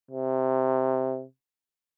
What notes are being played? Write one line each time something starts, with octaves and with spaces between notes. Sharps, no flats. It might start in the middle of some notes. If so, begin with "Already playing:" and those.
C3